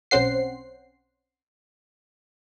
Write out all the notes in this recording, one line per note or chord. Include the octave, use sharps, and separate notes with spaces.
B1 C4 C#4 C5 F#5 C7